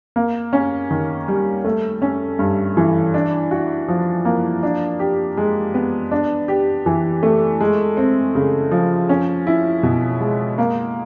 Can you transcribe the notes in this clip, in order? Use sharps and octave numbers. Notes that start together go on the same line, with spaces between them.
A#3
C#4
D#3
G3
A3
C#4
G2
E3
D4
F#4
F3
A#3
D4
G4
G#3
B3
D4
G4
E3
A3
G#3
C4
C#3
F3
C#4
E4
B2
G#3
A#3